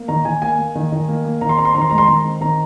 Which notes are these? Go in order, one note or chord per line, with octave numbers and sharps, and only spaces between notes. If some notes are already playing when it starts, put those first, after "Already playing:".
Already playing: A#3
D#3 A#5
D#3 G#5
A#3 G#5
A#3
D#3
D#3
A#3
A#3
D#3 A#5
C6
C4 A#5
C6
D#3 A#5
C6
G#3 A#5
C6
D#3 A#5
C4
D#3 A#5